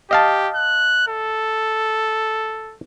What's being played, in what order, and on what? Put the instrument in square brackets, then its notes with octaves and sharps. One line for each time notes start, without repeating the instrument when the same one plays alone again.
[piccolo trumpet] G4 [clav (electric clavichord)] D#5 F5 A5
[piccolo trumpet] F#6
A4